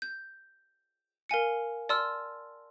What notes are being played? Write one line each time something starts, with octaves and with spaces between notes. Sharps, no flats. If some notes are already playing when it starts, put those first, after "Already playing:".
G6
A#4 F5 G#5 C#7
D5 A5 C6 E6 F6